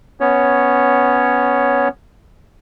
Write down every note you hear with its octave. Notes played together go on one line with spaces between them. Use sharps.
B3 C#4 C#5